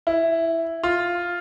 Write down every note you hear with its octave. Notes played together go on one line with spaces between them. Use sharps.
E4
F4